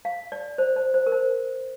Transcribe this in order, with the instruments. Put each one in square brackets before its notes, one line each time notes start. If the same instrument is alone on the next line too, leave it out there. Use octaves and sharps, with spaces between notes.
[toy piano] F5
D5
C5
C5
C5
A#4
C5